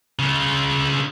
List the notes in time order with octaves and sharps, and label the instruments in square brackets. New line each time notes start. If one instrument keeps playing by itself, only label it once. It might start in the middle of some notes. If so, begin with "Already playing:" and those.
[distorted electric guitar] C#3 F4